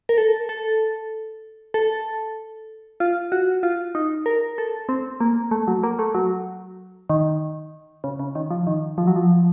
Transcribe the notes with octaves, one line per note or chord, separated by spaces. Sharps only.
A#4
A4
A4
A4
F4
F#4
F4
D#4
A#4
A4
C4
A#3
A3
F#3
A#3
A3
F#3
D#3
C#3
C#3
D#3
F3
D#3
F3
F#3
F3